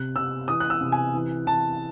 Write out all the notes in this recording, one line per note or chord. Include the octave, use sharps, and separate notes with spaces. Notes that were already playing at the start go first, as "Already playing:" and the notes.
Already playing: C3 F#6
C3 E6
E3 D#6
F#6
E6
C3
G#5
E3
E3 A5